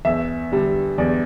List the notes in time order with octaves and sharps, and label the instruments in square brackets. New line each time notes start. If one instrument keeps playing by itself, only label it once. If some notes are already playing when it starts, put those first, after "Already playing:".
[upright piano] E2 E5
D3 G3
E2 D5